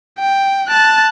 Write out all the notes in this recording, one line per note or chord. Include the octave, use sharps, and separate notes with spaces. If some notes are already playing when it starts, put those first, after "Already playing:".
G5
A5 F#6